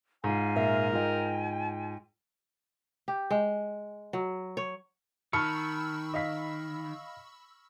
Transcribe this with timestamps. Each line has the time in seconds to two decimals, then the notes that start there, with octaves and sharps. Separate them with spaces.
0.24 G#2 F4 F5 G#5
0.56 A#2 A#4 E5
0.93 F4 D#5 G5 G#5
3.08 G4
3.31 G#3
4.13 F#3
4.57 C#5
5.33 D#3 A5 B5 C#6 E6 F6 C#7
6.14 D#5 F5 B6